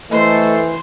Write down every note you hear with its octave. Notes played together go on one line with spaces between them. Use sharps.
E3 A3 A4 C5 D#5 C6